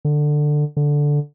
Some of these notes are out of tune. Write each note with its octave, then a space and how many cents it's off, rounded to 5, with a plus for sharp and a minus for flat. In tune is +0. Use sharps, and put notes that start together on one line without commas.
D3 +15
D3 -5